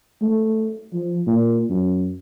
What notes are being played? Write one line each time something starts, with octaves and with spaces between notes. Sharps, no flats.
A3
F3
A#2
F#2